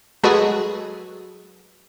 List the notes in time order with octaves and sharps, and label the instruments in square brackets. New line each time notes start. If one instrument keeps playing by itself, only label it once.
[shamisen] F#3 A4 B4 [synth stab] G#3 F#4 G#4